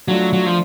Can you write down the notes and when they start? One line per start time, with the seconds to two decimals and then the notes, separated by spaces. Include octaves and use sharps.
0.08 F#3 A3 D4 F4
0.33 F#3
0.46 F3